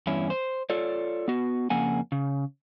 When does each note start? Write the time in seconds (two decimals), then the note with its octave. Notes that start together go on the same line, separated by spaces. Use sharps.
0.07 E2 G2 C#4 E4
0.30 C5
0.70 F4 A4 C#5 D5
1.28 B3 F#4
1.70 F2 C#3 A#3 F#5 G#5
2.12 C#3